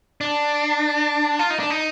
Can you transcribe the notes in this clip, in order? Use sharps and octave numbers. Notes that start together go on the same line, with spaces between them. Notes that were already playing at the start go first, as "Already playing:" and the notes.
D4
F4
D#4
D4
D#4